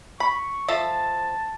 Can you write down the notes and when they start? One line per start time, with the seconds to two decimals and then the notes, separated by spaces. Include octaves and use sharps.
0.20 B5 C#6
0.68 F3 A4 E5 A5